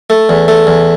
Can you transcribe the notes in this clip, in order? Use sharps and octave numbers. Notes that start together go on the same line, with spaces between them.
A3
E2
A3
E2